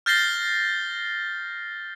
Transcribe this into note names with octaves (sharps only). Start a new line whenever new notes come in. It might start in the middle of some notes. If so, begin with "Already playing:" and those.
F6 G6 A6 A#6 C7 G7